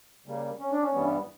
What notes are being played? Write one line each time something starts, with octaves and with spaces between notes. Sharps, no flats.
C#3 G3 A#3
C#4
D4
C#4
G2 E3 G3 B3